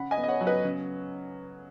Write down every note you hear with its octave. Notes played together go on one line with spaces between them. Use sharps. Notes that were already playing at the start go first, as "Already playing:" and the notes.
Already playing: C#3 F#5 B5
D#5 G#5
B3
D#5
C#5 F#5
F#3
B4 D#5
C#3